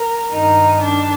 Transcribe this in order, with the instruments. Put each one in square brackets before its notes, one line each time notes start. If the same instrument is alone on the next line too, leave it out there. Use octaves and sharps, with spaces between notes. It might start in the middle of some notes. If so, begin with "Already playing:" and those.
Already playing: [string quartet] A#4
G2 D#3 D#4
D4